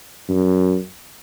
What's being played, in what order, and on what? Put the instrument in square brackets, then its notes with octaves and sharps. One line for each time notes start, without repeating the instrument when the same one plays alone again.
[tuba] F#2